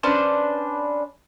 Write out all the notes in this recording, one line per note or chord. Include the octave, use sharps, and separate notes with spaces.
C#4 D4 B4 C5